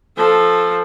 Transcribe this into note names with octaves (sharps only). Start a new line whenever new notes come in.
F3 A4